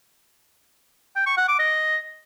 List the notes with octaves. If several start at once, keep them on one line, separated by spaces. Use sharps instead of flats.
G5
C#6
F#5
D6
D#5